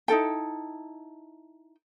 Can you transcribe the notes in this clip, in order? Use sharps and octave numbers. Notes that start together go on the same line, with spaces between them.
D#4 E4 A4 G5